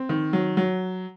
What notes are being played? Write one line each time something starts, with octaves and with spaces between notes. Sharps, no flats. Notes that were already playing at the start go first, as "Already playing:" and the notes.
Already playing: C4
D#3
F#3
F#3